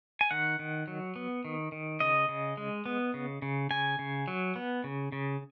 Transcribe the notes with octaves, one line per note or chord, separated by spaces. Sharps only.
G#5
D#3 F#5
D#3
F#3
B3
D#3
D#3
C#3 D#5
C#3
G#3
B3
C#3
C#3
C#3 G#5
C#3
F#3
B3
C#3
C#3